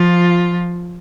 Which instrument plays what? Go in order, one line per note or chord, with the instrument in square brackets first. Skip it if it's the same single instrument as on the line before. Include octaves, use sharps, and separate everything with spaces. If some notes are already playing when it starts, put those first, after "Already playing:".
Already playing: [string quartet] F3 F4